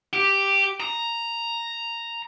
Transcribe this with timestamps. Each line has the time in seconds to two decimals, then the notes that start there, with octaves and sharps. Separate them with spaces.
0.13 G4
0.80 A#5